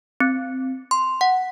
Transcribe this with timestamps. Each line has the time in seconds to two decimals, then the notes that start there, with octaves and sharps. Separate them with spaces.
0.20 C4
0.91 C6
1.21 F#5